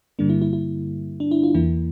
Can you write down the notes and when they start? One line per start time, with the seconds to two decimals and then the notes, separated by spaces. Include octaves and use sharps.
0.19 G2 D3 G3 A#3 D4
0.29 E4
0.42 E4
0.53 E4
1.20 D4
1.31 E4
1.43 F4
1.55 E2 E3 A#3 E4